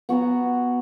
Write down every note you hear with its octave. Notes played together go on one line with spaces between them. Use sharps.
B3 F#4 G#5 A#5